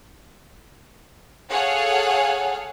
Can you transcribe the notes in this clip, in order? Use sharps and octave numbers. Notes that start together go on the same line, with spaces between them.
G#4 A4 C#5 F5 F#5